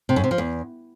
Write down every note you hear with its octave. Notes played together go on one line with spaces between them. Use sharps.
C3
F#2
C3
F3
E2